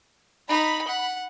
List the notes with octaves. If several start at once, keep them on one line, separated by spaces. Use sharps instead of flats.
D#4 B5
F#5